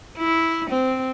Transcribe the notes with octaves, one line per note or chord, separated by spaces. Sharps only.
E4
C4